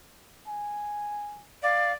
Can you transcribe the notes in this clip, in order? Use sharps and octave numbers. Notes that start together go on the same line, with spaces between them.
G#5
D5 F5